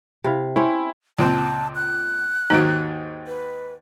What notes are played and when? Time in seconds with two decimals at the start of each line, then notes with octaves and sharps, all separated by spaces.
0.24 C3 E4 F5
0.56 C4 C#4 E4 C#5
1.19 C#2 A#2 C4 A5
1.75 F#6
2.50 D#2 G#2 D#3 D#4 F#4
3.27 B4